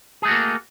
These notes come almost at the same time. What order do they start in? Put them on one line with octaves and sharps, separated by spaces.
G#4 A3 F#4 A#3